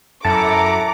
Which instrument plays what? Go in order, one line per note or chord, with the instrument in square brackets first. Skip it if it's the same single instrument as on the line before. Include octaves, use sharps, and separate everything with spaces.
[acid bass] F#2 [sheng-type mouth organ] E4 A4 F#5 [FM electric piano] A5 [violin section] A#5 D6